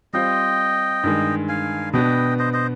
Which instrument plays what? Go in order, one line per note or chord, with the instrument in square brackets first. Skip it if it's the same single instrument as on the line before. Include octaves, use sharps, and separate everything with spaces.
[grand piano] G3 C4 F4 C5 [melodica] D#5 G5
[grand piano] G2 D#3 G#3
[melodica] F5 G#5
[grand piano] B2 B3 D4 [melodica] D#5 G5
[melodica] C5 D#5
C5 D#5